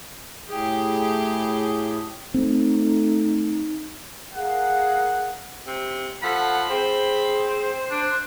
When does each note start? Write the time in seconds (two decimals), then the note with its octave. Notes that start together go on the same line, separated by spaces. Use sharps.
0.49 A2 G4 G#4
2.34 A3 C4 D#4
4.34 G#4 A#4 F5 F#5
5.66 C3
6.23 F3 A4 F#5 B5
6.70 C4 G#4 C5
7.91 D4